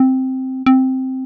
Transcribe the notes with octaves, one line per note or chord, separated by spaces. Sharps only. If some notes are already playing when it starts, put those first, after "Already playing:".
Already playing: C4
C4